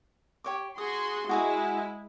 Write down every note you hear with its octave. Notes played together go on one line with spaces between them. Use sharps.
G4 C#5 D6
F#4 G#4 C6 D#6
G#3 E4 F#4 G#4 F#5